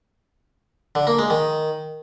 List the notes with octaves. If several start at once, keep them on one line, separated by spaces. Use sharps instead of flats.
D3
A#3
G#3
D#3